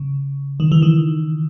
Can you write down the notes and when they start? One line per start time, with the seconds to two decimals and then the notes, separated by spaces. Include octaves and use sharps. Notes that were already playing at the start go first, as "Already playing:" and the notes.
Already playing: C#3
0.60 D#3
0.72 E3
0.82 D#3